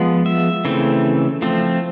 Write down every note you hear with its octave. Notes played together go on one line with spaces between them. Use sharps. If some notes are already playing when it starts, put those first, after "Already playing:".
Already playing: F3 G#3 B3
E5
C#3 E3 A3 C4
F3 A3 C4